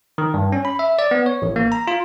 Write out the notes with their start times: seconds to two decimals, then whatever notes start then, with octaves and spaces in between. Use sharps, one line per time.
0.18 D#3
0.34 G2
0.52 C#4
0.65 B5
0.79 E5
0.99 D5
1.11 B3
1.26 C#5
1.42 A1
1.56 A#3
1.72 A#5
1.87 F4